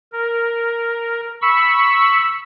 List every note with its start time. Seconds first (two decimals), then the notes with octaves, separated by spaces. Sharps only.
0.13 A#4
1.42 B5 C#6 E6